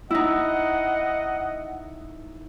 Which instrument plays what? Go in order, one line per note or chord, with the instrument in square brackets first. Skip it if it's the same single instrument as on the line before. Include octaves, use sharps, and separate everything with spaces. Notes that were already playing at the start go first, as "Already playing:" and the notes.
[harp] D#4 E4 [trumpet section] D#5 F#5